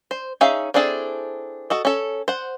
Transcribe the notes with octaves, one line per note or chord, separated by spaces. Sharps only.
C5
C#4 D#4 G#4 E5 F5
C4 D4 E4 G#4 A4
F#4 A4 D#5
C#4 A4
C5 F#5